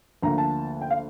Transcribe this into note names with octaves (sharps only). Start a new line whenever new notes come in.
D2 D3 F3 A#3 A#5
A5
G5
F5